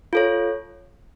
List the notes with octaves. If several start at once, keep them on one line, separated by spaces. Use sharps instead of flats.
F4 A4 C#5